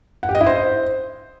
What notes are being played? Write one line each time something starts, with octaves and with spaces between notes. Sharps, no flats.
F#5
G4
D#5
E4
C5